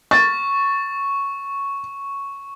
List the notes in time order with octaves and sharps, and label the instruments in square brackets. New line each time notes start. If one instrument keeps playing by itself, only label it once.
[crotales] C#6 [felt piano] A6